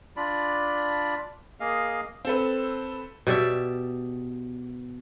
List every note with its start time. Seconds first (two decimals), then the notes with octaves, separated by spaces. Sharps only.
0.16 D4 F4 D5 B5
1.60 A#3 G#4 D#5 F5
2.25 C4 A4 B4
3.27 B2 G4 D5 E5